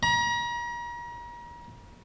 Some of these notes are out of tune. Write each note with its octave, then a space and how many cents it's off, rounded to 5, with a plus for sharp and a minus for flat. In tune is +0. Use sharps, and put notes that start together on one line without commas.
A#5 +40